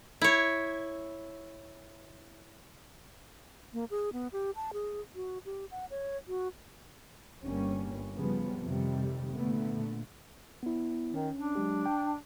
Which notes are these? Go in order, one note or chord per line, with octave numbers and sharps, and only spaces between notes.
E4 C#5
A#3
G#4
B3
G4
A5
G#4
F#4
G4
F#5
C#5
F#4
G1 G3 A#3 C#4
C#3 F3 G3 B3
F2 C3 D#3 G3
A#2 D3 A3 B3
B3 E4
D#3 C#4
D4
F#3 G#3 G4
G5